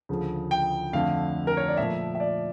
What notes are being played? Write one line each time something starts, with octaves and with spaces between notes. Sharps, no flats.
D2 C#3 F3
G5
F2 D3 A3 F5
A#4
C#5
D5
A#2 F3 A3 E5
E5
D5